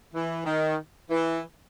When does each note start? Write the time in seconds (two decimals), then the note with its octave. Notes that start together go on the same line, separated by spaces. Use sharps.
0.13 E3
0.46 D#3
1.11 E3